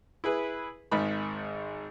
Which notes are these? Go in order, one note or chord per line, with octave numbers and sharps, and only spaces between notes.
E4 G#4 B4
G#1 G#2 D#3 B5